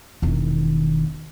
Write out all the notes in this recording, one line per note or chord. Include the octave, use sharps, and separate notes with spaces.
E1 D#3